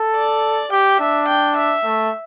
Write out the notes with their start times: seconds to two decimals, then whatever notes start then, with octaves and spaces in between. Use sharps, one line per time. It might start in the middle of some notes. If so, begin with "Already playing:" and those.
Already playing: A4
0.15 D5
0.71 G4 G5
1.00 D4 E5
1.28 G5
1.56 E5
1.84 A3